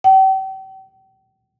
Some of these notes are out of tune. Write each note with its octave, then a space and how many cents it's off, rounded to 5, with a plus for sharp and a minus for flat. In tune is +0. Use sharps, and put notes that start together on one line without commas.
G5 -40